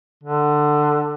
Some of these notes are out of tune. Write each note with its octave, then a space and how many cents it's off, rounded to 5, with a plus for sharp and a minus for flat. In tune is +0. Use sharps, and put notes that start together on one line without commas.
D3 +15